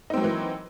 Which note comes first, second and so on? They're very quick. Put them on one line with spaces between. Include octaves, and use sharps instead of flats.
D#4 C4 F#3 A#3 E3